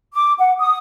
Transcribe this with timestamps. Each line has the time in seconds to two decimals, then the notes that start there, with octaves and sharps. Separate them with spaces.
0.14 D6
0.39 F#5
0.59 D#6